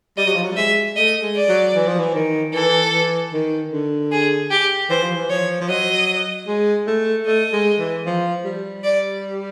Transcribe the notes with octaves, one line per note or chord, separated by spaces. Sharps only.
G3 D#5
F#3
F3
F#3
G3
G#3 E5
A3 D#5
G#3
D5
F#3
E3
F3
E3
D#3
E3 A4
E3
D#3
D3
G#4
G4
E3 C5
F3
E3
F3 C#5
F3
F#3 D#5
G#3
A3
A3 D#5
G#3
E3
F3
G3
D5